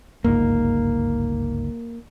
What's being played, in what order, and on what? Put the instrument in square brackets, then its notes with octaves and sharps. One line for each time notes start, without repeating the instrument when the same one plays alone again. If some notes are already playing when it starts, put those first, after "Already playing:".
[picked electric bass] G1 C#2 G#2 [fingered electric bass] A#3